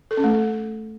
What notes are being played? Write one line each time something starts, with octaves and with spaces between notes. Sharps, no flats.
A4
C#4
A3